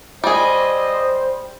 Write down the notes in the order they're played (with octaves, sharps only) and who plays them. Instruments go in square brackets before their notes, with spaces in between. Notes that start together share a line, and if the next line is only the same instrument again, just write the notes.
[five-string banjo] G3 G#4 [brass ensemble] C5 [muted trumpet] D#5